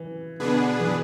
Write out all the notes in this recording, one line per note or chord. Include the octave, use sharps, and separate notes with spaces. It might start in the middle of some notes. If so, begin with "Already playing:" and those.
Already playing: E3
B2 D3 B3 D4 G#4 B4
E3